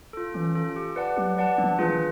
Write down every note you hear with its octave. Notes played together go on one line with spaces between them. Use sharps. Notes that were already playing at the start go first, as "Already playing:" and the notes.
F4 A4
E3 C#4
F4 A4
G4
B4 D5 F#5 A5
F#3 G4
B4 D5 F#5 A5
F3 D4
F#3
F3
E3 F4 G#4 B4
D#3